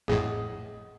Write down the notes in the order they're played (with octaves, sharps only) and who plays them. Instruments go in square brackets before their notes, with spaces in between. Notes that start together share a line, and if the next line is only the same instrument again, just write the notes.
[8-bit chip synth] A1 F2 A2 [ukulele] G#4 D#5 F#5